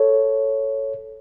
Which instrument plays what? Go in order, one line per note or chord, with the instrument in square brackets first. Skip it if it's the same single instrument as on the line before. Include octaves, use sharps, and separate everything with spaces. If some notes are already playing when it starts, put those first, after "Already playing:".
Already playing: [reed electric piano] A4 C#5